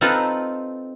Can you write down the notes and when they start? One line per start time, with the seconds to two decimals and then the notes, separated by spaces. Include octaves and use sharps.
0.01 C4 D#4 F4 A4 B4